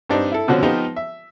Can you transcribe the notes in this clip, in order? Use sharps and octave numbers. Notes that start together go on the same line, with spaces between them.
G2 C4 D4 D#4
E4 A4
B2 D3 F3 C4 C#4 F#4
F3 B3 D#4 F4 G4
E5